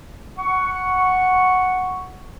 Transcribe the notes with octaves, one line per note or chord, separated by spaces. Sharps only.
F#5 C#6